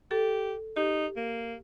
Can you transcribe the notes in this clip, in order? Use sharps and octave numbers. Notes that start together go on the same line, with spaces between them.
G4 A4
D#4 G4
A#3